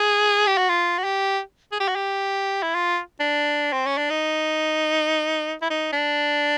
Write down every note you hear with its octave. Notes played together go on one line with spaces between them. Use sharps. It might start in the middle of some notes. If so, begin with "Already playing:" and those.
Already playing: G#4
G4
F#4
F4
F#4
G4
G#4
G4
F#4
G4
E4
F4
D4
C4
C#4
D4
D#4
E4
D#4
D4